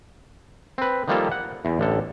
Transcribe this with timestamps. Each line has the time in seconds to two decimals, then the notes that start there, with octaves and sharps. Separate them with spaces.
0.78 C4 B4
1.08 D#3 F3 G3 A#3 F4 A4
1.32 F#5
1.65 E2
1.79 A1 D3 A4